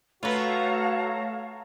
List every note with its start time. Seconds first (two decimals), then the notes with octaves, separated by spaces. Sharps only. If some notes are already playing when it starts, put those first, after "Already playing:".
0.23 A3 F4 F#4 A4 B4 C#5 F5 A#5